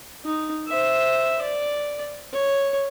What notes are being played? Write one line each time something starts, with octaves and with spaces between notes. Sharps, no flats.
D#4
C5 E5
D5
C#5